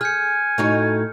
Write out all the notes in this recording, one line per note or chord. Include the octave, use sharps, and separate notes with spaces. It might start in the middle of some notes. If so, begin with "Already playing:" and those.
G#4 G#5 F6 G6 C#7
A2 D#4 F#4